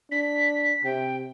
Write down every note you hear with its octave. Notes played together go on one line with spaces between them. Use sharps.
D4 B6
C3 G5